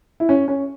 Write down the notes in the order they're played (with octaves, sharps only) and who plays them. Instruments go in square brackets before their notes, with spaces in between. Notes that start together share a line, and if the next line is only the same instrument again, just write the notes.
[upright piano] E4
C#4
C#4